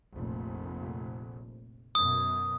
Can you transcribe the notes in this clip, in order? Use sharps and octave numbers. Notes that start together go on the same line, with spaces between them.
F1 A#1
F#2 B2 D#6